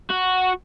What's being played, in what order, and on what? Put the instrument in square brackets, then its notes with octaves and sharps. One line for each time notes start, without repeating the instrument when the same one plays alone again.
[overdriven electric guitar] F#4